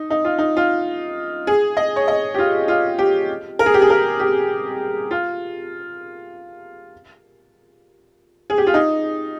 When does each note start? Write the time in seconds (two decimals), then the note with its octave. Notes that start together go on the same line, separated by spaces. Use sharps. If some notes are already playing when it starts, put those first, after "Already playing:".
Already playing: D#4
0.10 D#4
0.24 F4
0.38 D#4
0.57 F4
1.47 G#4
1.77 D#5
1.96 C#5
2.08 D#5
2.34 G4
2.38 F4
2.68 F4
2.99 G4
3.59 A#4
3.66 G#4
3.74 G4
3.82 G#4
3.90 A#4
4.20 G4
5.11 F4
8.50 G#4
8.58 G4
8.67 F4
8.74 D#4